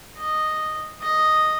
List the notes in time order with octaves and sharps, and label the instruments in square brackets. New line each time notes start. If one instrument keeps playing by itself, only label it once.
[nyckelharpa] D#5
D#5